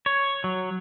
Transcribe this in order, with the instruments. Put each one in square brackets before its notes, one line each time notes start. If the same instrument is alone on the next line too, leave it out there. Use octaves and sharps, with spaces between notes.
[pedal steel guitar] C#5
F#3